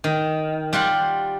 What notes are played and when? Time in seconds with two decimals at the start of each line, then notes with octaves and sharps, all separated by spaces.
0.04 D#3
0.73 G3 F4 F#5 C6